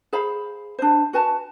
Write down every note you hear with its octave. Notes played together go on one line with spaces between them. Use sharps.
G#4 C5 F5 B5
D4 C5
F#4 B4 G#5 A5